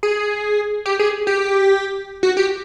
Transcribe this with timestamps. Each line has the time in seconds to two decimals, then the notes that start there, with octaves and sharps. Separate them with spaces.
0.03 G#4
0.86 G4
0.99 G#4
1.27 G4
2.23 F#4
2.37 G4